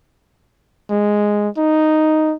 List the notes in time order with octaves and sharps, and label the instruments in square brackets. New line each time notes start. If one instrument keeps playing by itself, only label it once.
[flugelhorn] G#3
D#4